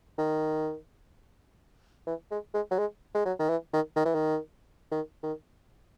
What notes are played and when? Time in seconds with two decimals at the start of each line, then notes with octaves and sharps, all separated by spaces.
0.18 D#3
2.07 E3
2.31 G#3
2.54 G#3
2.71 F#3
2.78 G#3
3.14 G#3
3.25 F#3
3.39 D#3
3.49 E3
3.73 D#3
3.96 D#3
4.05 E3
4.14 D#3
4.91 D#3
5.23 D#3